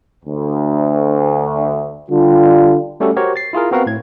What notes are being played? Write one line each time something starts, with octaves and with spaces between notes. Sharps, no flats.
D2
D3 G3 F4
G3 A3 C#4 F#4 G4 A4
F#4 G4 A#4 C5 C#5
A6 C7
E4 F4 G#4 A#4
B3 C4 F#4 A#4 B4 F5
A2 G#6